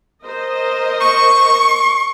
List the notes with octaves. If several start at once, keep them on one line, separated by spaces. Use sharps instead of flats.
A#4 C5 D#5
C#6